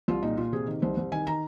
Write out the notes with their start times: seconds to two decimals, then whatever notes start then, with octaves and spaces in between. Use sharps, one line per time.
0.08 C2 F4
0.23 A#2 D#4
0.37 A#2 F4
0.52 C3 G#4
0.67 D#3
0.82 C2 C5
0.97 C2
1.12 D#3 G#5
1.27 D#3 A#5